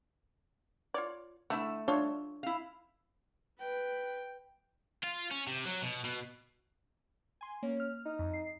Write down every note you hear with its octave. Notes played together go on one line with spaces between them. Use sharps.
F4 C#5 D5
D3 A3 E4 E5
D4 F4 A4 C#5
E4 F5
B4 G5
F4
C#4
C3
F#3
B2
B2
G#5 C6
A#3 C#4
F6
D#4
F2
C7